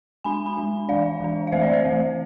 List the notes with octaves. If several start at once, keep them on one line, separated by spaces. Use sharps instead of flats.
G#3 D4 G#5 B5
G#5 B5
G#3 D4
E3 G#3 D4 D5 F5
E3 G#3 D4
F5
E3 A3 C4 C5 E5
D5
C5
E3 A3 C4